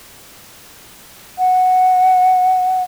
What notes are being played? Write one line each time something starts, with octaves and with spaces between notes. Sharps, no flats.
F#5